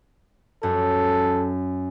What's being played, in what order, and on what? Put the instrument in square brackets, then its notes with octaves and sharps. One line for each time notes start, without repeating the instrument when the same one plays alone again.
[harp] F#2 [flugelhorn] A4